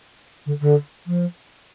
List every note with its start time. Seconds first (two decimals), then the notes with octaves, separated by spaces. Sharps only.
0.46 D3
0.61 D3
1.07 F3